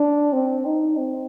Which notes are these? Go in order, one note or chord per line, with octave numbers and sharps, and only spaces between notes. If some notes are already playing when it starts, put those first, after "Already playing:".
Already playing: D4
C4
D#4
C4